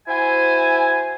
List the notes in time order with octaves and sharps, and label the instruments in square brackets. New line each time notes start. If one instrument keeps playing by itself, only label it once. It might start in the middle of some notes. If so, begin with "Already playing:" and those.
[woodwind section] E4 F#4 C5 E5 G#5